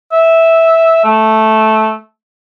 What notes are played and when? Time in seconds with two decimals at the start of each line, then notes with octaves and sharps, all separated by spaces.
0.12 E5
1.04 A3